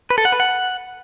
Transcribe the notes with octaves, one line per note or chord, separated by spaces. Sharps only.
B4
A4
F#5
B4
F#5